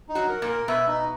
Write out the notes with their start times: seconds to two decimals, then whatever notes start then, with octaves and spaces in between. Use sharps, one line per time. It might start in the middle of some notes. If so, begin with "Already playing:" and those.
0.09 D#4
0.15 F#3 F#4
0.29 A#4
0.42 A#2 A#3
0.49 A#4
0.68 B2 B3 E5
0.88 D#4